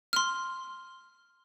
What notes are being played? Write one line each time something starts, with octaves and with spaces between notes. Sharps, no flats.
C6 F6